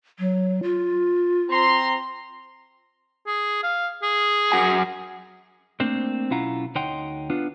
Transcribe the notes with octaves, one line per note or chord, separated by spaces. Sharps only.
F#3
F4
C4 A#5 C6
G#4
F5
G#4
F#2 F#4 G#5
A3 A#3 C4 D4 C5
B1 C#4 E4 F4 F#5 A#5
D2 D#4 C#5 F#5 G5 C6
B3 D4 F4